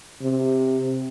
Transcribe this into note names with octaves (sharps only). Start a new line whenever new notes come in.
C3